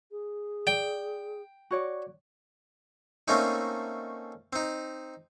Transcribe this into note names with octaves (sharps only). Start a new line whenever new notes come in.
G#4
D5 G5
F#4 C#5 D5
A3 A#3 C4 C#4 D#4
C4 D#4